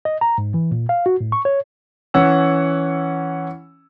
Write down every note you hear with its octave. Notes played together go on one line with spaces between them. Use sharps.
D#5
A#5
G#2
E3
A#2
F5
F#4
A2
C#6
C#5
E3 C#4 F#5 E6